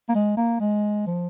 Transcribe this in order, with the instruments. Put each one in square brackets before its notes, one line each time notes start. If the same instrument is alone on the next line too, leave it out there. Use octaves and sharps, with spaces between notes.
[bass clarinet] A#3
G#3
A#3
G#3
F3